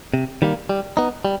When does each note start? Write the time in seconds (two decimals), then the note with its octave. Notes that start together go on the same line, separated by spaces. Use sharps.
0.14 C3
0.42 D#3 G3 A#3
0.69 G3
0.97 B3 D#4
1.25 G3